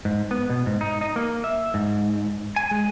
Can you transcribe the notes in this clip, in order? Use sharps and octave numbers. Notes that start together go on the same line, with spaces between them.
G#2
B3
B2
G#2
D#4
D#4
A#3
E5
G#2
G#5
G#3